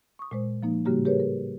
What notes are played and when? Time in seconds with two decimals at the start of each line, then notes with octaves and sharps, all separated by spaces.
0.19 C#6 D#6
0.31 A#2 G#3 C5
0.63 F3 A#3 D#4
0.85 A2 C#3 G3 A#3 F#4 G4
1.05 G4 G#4 A#4 B4 C#5
1.20 A#4